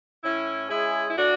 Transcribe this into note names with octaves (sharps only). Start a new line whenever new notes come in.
A2 C#4 E4
G#3 C#4 E4 G#4
E4
A2 D4 F#4